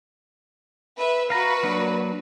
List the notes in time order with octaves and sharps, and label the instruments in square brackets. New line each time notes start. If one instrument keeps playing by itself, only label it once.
[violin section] B4 E5
[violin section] F#4 B4 [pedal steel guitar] F5 A#5
[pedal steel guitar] F#3 A#3 D4